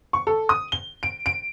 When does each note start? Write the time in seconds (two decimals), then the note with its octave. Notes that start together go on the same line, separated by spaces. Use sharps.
0.13 C#6
0.27 A4
0.49 D#6
0.72 G7
1.03 D7
1.26 D7